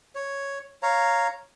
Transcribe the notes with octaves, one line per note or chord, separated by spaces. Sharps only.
C#5
C#5 F5 A#5